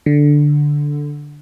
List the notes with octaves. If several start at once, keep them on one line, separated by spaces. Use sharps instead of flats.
D3